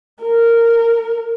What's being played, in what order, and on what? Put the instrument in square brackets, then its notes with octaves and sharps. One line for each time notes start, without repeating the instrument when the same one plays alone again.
[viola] A#4